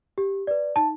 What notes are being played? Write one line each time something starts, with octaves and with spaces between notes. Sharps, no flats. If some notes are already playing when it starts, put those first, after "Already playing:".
G4
B4 D5
D#4 A5